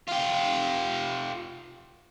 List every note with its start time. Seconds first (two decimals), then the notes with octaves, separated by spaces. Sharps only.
0.09 F4 G4